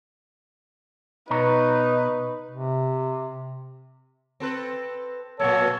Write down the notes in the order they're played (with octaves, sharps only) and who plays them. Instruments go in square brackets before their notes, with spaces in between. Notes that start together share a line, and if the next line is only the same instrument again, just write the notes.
[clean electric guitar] B2 C#5 A#5 [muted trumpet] D#4 [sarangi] B4
[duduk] C3
[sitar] C4 A4 B4
[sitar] A#2 F#3 A#3 [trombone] A4 [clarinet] C#5